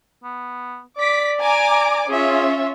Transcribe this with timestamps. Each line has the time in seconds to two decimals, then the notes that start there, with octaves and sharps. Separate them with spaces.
0.24 B3
0.98 D5 D6 B6
1.40 G#5 A#5 D6
2.09 C#4 F4 G#4 E5